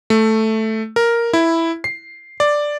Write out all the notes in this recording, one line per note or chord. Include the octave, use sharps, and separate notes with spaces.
A3
A#4
E4
C7
D5